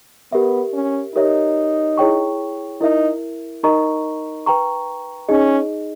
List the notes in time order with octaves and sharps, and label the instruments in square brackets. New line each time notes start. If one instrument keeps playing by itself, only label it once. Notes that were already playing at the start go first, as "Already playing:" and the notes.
[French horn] B3 [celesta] G4 A#4 E5
[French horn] C#4
[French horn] D#4 [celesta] G4 A#4 C#5 E5
[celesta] E4 G#4 C#5 G5 C#6
[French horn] D#4 [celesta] E4 A#4 E5
[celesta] D#4 A#4 D#5 A#5 C#6
B4 G5 A#5 C#6
[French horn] C#4 [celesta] D#4 G#4 D#5